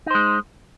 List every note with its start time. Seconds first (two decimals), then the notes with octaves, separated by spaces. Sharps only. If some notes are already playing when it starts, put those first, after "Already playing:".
0.06 D#4
0.11 C5
0.15 G#3